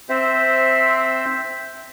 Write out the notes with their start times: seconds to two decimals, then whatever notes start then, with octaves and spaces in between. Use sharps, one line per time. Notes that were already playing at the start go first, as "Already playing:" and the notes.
0.09 C4 C5 E5